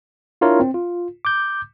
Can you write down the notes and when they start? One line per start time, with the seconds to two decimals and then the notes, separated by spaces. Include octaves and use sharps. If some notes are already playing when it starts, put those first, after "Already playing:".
0.41 D4 E4 F4 A#4 C#5
0.60 C4
0.74 F4
1.25 D6 G6